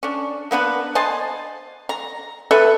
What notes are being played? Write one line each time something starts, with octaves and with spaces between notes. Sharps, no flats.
C#4 D4
A#3 B3 D4 B4
C5 D#5 G#5 A5
A#5
A4 B4 E5